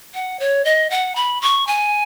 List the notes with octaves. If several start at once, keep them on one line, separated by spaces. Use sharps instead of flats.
F#5
C#5
D#5
F#5
B5
C#6
G#5